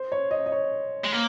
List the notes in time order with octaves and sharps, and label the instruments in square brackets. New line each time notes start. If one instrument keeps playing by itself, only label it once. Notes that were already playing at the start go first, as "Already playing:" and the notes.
Already playing: [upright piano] C5
C#5
D#5
D#5
C#5
[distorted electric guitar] G#3
A#3